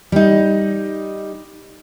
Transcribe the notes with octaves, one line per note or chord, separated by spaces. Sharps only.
G3 D#4